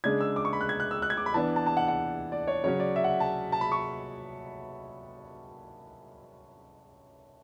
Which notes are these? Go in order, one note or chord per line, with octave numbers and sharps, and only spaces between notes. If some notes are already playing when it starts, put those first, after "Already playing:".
C#3 G#3 D4 G#6
E6
D6
C#6
B5
F#6
G#6
F#6
E6
F#6
G#6
D6
B5
E3 B3 D4 A5
A5
A5
F#5
F#5
D5
C#5
C#3 F#3 C#4 C#5
D5
E5
F#5
A5
A5
B5
C#6